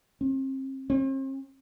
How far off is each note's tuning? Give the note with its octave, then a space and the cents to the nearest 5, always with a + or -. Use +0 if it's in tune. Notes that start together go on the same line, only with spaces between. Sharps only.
C4 +40
C4 +45